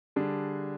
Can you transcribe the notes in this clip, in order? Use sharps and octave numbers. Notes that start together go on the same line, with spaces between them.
D3 G3 D4 G#4